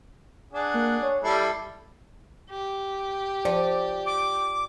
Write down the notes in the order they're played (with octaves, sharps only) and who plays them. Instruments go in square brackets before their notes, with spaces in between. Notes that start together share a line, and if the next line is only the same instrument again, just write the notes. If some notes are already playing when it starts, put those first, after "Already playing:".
[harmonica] D4 G#4 F#5
[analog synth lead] A#3
C#5
[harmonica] G3 E4 A4 [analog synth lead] C7
[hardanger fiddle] G4
[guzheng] F3 [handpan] D5
[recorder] D6